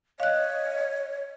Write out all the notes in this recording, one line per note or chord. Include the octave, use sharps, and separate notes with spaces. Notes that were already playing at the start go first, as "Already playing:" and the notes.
C#5 D#5 F5 F#6